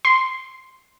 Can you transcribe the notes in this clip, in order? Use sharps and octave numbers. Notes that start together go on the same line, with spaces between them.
C6